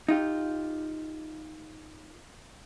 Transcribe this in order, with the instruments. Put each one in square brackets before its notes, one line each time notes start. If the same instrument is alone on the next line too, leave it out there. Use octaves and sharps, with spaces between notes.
[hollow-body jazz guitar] D#4 F4 G4